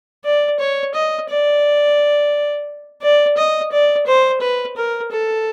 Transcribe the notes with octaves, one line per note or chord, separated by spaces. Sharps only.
D5
C#5
D#5
D5
D5
D#5
D5
C5
B4
A#4
A4